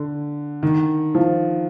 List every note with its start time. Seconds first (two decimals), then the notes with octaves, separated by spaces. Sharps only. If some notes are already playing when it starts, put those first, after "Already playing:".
Already playing: D3
0.63 D#3
1.15 F3